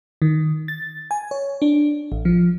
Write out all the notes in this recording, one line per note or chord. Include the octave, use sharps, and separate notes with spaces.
D#3
A6
G#5
C#5
D4
A1
F3